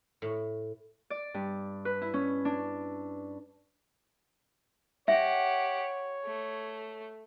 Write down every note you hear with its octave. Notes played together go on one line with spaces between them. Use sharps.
A2
D5
G2
B4
E4
C#4
D4
G4 C#5 E5 F#5
A3